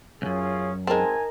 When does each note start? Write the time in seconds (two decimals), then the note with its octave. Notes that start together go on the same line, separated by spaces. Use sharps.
0.22 C2 F#2 C#4 F4 G#4
0.87 G#3 C4 D#4 A#4 G#5 A5